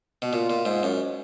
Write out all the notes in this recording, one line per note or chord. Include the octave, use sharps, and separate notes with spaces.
B2
A#2 F4
A#2
G#2
F#2